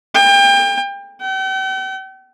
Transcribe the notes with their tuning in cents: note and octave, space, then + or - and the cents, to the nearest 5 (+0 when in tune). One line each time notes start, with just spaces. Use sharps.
G5 +30
G5 -45